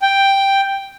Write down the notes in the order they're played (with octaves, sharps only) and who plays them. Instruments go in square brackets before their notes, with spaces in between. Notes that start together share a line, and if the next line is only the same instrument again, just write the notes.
[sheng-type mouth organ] G5